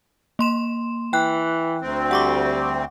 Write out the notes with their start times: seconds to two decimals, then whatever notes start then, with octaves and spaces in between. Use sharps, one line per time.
0.39 A#3 C6 E7
1.13 E3 G5 F#6
1.81 D2 C4
2.11 G3 F#5 C#6 D6